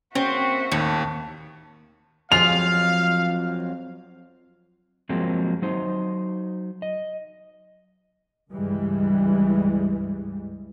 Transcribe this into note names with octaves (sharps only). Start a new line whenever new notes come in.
A#3 C4 C#4 F#4 E5
D#2 A2
F2 F3 F#3 G#3 F4 F5 F7
F3 F#3 G#3 A#3 C4
F#3 D#4 C5
D#5
C#2 G2 E3 G3 G#3